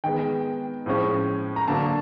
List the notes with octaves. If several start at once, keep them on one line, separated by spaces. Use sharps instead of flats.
D#3 G#3 B3 G5
A2 F3 G#3 C#4
A#5
D3 F#3 A#3 D4 A5